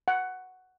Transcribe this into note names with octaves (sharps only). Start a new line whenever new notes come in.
F#5